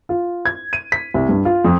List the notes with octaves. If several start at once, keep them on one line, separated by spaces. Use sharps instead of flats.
F4
G#6
D#7
B6
C2
G2
F4
F2